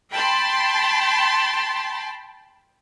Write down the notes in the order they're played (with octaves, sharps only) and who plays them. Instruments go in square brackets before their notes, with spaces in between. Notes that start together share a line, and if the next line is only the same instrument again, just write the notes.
[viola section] G5 A5 B5 C6